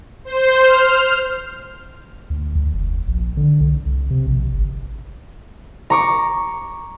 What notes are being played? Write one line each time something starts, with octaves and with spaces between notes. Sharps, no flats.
C5
F6
D2
D2
F1
A#1
D3
C2
C2
C3
A#1
G1
A#5 C#6 D6